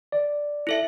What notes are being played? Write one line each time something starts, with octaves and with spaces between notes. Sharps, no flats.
D5
E4 A4 E5